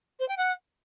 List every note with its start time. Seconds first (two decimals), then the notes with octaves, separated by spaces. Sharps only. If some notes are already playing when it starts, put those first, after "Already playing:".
0.19 C5
0.28 G5
0.37 F#5